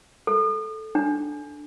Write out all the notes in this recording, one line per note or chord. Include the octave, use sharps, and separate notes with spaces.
A4
D4